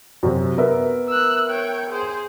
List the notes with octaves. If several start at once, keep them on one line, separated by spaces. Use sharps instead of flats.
F#2 C3
B3 A#4 E5
E6 F#6
C#5 G5
G#4 C5